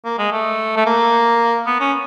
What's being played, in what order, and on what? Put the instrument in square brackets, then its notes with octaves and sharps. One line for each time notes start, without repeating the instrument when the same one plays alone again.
[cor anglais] A#3
G#3
A3
A3
A#3
B3
C#4